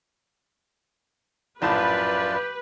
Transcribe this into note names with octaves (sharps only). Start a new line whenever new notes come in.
A#1 F#2 A2 F4 G4 B4 D5 A5